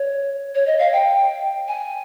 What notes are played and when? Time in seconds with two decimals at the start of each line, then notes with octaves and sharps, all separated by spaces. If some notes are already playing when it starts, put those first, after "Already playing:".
Already playing: C#5
0.55 C#5
0.67 D#5
0.79 F5
0.93 G5
1.68 G#5